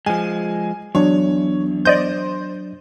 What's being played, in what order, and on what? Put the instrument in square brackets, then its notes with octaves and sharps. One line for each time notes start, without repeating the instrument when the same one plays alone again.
[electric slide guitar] F3 G#3 [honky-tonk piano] G#5
[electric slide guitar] E2 [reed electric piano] F#3 D4 [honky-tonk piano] C#5
[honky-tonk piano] C5 [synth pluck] D5 D#5 G6